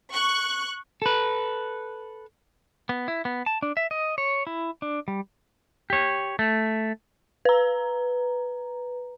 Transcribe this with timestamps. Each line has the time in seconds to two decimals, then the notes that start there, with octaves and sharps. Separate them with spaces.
0.13 C#6 F#6
1.02 A4 B4
2.89 B3
3.08 E4
3.25 B3
3.46 A5
3.62 D4
3.77 E5
3.91 D#5
4.18 C#5
4.47 E4
4.82 D4
5.08 G3
5.90 G4 C#5
6.39 A3
7.45 B4 A#5